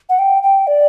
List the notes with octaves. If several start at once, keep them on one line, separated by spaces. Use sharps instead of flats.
F#5
G5
G5
D5